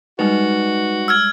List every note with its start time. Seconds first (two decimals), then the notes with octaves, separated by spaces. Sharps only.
0.19 G3 G#3 D#4 F#4 B4
1.08 E6 F6 G#6